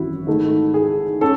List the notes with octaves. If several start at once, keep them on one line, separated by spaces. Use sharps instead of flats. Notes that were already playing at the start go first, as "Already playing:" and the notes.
Already playing: G#1 F#2 E3 E4 F#4
G#2 D#3 A3
G#4
C#4 A4